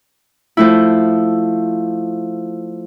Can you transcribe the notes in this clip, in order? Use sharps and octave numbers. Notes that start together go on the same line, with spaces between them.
F3 A3 E4